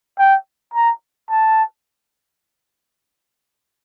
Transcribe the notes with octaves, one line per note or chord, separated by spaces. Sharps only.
G5
A#5
A5